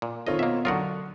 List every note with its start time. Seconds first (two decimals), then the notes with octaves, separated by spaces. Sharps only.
0.02 A#2
0.27 D#3 C4 F4 A4 C#5 D#5
0.39 B2 A#3 D#5 E5
0.65 D3 F#3 F4 A#4 F#5 C#6 D#6